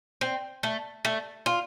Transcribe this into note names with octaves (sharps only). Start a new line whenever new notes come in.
C4
A3
A3
F4